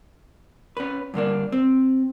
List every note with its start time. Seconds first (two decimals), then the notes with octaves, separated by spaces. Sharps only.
0.77 C#4 B4
1.14 G2 D3 A#3 D4
1.52 C4